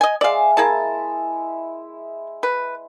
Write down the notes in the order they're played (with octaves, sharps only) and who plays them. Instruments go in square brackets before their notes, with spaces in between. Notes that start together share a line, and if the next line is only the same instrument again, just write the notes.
[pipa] D#5 G#5
[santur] G#3 E5 [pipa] D5 F5
[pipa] A#3 G#4 A5 [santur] E4
[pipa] B4